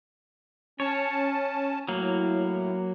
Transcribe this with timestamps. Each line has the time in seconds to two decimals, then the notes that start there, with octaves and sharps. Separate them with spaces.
0.80 C#4 C#5 A5
1.88 A2 F#3 A#3